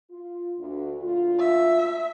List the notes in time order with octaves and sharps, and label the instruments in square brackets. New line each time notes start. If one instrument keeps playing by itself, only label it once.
[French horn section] F4
D2
D2 A#2 F4
[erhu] E5